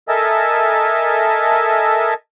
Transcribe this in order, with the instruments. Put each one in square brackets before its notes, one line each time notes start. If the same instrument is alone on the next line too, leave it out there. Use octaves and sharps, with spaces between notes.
[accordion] A4 A#4 D#5 E5 G#5 A5